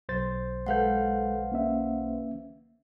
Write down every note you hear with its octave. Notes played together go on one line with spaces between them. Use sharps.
B1 C5 A6
G#3 A4 B4 F5 F#5 G6
A#3 C#4 E5